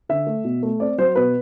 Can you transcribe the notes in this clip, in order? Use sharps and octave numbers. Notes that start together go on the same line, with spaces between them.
D3 E5
A3
B2
A3
C4 D5
F#3 C5
B2 B4